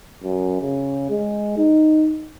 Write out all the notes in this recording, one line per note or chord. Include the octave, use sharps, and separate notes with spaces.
F#2
C#3
G#3
D#4